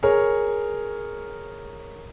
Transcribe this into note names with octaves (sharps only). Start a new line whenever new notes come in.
G#4 A#4 C#5